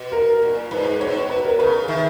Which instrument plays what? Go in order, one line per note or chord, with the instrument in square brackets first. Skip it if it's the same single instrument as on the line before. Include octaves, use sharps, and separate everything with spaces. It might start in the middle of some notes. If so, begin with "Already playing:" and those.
Already playing: [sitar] B2
[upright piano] A#4
[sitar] A#2
[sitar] G#2 [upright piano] B4
[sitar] B2 [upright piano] C#5
[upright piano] B4
A#4
[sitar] C#3 [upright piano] B4
[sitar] D#3 [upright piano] E5